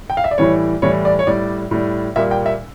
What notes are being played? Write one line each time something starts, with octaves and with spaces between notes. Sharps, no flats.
G5
F5
E5
D5
A2 E3 G3 C#5
A2 E3 G3 C#5
D5
C#5
A2 G3 D5
A2 G3
A#2 G3 E5
G5
E5